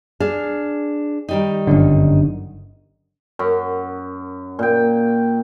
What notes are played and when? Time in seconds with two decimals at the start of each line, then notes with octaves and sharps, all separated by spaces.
0.20 D4 G#4 F5
1.29 D#3 G3 D#4
1.67 G1 F#2 D3
3.39 F#2
4.59 A#2 G5